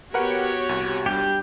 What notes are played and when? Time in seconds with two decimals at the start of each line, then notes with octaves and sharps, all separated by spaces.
0.14 B3 F#4 G4 A#4 B4 C#5 F#5
0.69 C2
1.06 G3 D4 G4